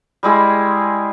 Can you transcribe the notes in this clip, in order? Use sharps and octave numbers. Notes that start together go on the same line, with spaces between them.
G3 G#3 E4 G#4